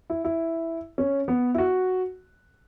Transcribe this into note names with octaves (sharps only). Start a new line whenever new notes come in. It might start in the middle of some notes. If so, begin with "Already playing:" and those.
E4
E4
C#4
B3
E4
F#4